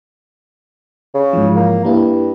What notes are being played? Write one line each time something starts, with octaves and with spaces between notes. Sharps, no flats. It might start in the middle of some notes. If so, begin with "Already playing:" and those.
C#3
G#2 E3 F3
A#3
G2 A#3 E4